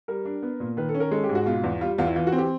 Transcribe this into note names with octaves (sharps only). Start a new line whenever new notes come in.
G3 A#4
D4
B3
A#2
D#3 B4
A4
C#4
A#4
G#3 A4
G4
G#2
F#4
B2 F4
E2
G3 F4
E2 F4
E4
E3 F4
F#4
C4
G4